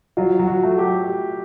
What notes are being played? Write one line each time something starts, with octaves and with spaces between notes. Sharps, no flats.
F#3 F4
F#3
F#4
A3
G4